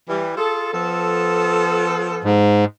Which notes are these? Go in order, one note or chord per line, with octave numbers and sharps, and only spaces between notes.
E3 G3
F4 G#4 A4
F3 B3 A4
G#2